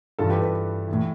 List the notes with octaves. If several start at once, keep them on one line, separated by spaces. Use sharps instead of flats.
G2 E3 F4 A4
G4 B4
G4 B4
A2 E3